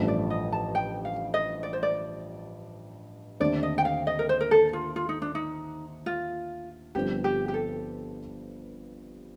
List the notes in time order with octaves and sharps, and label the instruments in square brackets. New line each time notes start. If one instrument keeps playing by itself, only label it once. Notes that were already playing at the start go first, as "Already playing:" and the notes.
Already playing: [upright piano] A1 G2 F3 A3
[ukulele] D5
D#5
A5
G5
F5
D#5
D5
C5
D5
[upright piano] D#2 D3 A3 C4 [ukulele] D5
[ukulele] D#5
G5
F5
D#5
A#4
C5
A#4
A4
F4
F4
D#4
D4
D#4
F4
[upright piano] G1 G2 F3 C4 [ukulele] G4
[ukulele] G4
G4
A4